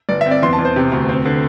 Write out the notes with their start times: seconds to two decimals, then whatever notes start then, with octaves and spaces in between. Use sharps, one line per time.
0.09 G1 D5
0.21 E5
0.26 C4 D5
0.42 E2 C6
0.53 A5
0.59 E2
0.65 C5
0.76 C3
0.92 D2
1.09 C4
1.25 D3